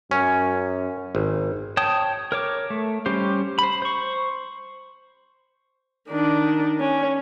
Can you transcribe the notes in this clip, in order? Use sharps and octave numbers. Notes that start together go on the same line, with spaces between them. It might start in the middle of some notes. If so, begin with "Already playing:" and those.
F#2 C#4
G#1
C#5 G5 A5 D#6
A#4 C#5 D6
A3
G3 C#4 G4 C5
C5 B5
C5 C#6
D#3 D4
C#4